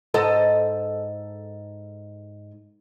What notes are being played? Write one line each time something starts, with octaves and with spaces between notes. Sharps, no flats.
G#2 A4 D#5